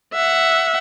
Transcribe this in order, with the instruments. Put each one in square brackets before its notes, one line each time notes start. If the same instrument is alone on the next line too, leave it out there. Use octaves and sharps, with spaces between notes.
[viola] E5 F#5